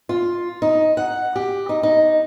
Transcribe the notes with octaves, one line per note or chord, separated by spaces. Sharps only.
F4
D#4
F#5
G4
D#4
D#4